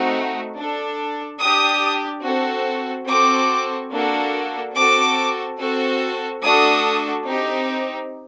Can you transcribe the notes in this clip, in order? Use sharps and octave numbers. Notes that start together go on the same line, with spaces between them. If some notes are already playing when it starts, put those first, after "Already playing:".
Already playing: A3 C4 D#4 F#4
D4 A4
D4 G4 D#6
C4 F#4 A4
C4 F#4 A4 D6
A#3 D4 F#4 A4
C4 F#4 A4 D6
C4 F#4 A4
A3 D4 F#4 A4 D#6
C4 D#4 G4